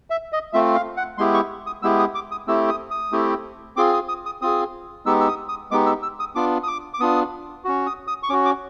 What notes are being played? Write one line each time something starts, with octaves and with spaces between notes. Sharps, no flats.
E5
D#5
A3 C4 F4 E5
F5
F#5
G#3 B3 E4 G4 C6
C#6
D#6
G#3 B3 E4 G4 E6
D#6
D6
D#6
A3 C4 E4 G4 E6
D#6
D#6
A3 C4 E4 G4
C4 F4 G#4 D6
D#6
D#6
D#6
C4 F4 G#4 D#6
G#3 B3 D#4 G4 E6
E6
D#6
D#6
G#3 B3 D#4 G4 D6
E6
E6
D#6
B3 D4 F4 D6
D#6
D6
D6
B3 D4 F4 D#6
C#4 F#4
D#6
D#6
C#6
C#4 F#4 D6
D6